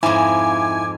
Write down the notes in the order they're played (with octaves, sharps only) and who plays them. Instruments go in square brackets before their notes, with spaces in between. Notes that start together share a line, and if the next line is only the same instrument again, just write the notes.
[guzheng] F2 G#2 [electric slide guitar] E4 [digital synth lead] G#5 [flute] D6